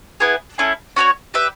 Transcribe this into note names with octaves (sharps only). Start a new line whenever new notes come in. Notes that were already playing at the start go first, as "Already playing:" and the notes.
B3 E4 G#4 B4
A3 C#4 E4 G#4
C#4 F#4 A4 C#5
G4 B4 E5